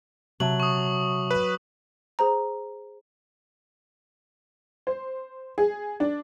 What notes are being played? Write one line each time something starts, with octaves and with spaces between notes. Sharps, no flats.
C3 F#3 E5 A5 F#7
C#6 D#6
B4
G#4 C5 A#5
C5
G#4
D4